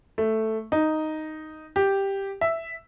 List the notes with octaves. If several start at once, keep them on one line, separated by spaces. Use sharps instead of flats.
A3
D#4
G4
E5